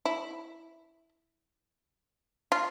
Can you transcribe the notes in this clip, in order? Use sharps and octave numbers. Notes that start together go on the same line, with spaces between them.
E4
F4